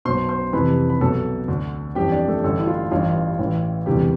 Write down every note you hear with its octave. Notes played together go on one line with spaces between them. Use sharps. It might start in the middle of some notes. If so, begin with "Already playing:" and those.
B1 B2 C5 C6
C5 C6
F1 F2 C3 E3 B4 B5
B5
B1 B2 A4 A5
D2 D3
G1 F2 E3 G4 G5
D4 D5
A3 A4
A1 G2 D3 A3 A4
E4
F4
A1 G2 E3 F4
A1 A2 E3
E1 D2 C3 E3 G3 G4